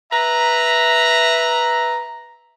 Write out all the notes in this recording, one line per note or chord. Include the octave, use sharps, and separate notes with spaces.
B4 E5 A#5